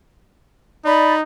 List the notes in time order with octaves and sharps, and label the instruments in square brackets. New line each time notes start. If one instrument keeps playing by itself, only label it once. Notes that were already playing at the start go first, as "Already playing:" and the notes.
[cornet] D#4 [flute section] D5 B5